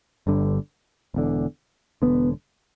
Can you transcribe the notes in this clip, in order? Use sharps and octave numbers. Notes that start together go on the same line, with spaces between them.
G1 G2 D3
E1 E2 D3
E1 E2 D3 B3